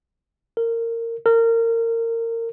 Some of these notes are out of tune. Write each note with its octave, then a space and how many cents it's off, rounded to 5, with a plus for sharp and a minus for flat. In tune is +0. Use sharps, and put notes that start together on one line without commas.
A#4 -20
A#4 -25